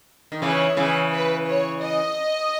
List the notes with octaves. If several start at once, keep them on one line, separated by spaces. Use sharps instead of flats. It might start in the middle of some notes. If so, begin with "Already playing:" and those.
D#3
C#3 E3 C#5
C#3 E3
B4
C#5
D#5